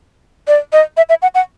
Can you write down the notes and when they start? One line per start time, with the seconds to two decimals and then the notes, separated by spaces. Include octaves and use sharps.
0.48 D5
0.73 D#5
0.97 E5
1.09 E5
1.22 F#5
1.35 F#5